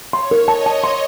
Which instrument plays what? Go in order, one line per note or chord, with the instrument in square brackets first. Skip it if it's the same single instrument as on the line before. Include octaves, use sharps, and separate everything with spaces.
[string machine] C#5 [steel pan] C6
[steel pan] A#4
[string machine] D#5 [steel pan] A5
[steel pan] A5
C6